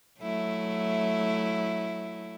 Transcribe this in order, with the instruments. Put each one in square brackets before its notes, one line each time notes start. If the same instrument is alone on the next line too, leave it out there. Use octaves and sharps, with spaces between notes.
[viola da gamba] F#3 A3 E4